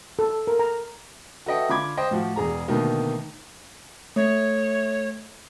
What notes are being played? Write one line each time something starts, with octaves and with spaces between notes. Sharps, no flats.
A4
A#4
A#5
F#4 A4 B4 D#5 E5 G5
D3 F4 B5 D6 G#6
C5 D#5 G5
A2 F3 F#4
E1 G#4 A#5
B2 D3 D#3 A3 A#3 D#4
A3 C#5